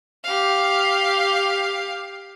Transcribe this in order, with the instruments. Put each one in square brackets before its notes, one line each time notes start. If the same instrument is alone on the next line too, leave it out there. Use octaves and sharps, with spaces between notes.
[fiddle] G4 F5